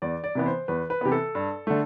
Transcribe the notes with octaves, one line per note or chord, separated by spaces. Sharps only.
E2 D5
D5
C3 E3 B3
C5
E2 B4
B4
C3 E3 B3 G4
A4
G2
D3 A3